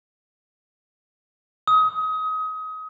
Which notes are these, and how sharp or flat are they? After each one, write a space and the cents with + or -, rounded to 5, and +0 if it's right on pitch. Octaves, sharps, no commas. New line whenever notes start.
D#6 +25